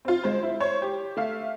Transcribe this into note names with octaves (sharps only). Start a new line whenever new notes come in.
C4 F4
G#3 C5
E4
C5 C#5
G4
A3 E5 F5